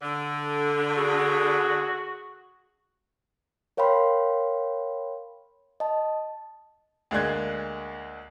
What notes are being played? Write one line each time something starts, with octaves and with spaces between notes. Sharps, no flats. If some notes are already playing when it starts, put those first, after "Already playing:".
D3
F#4 G#4
A#4 C#5 F5 G5 B5 C6
D#5 A5
D2 G#3 A#3 D4 F#6 G#6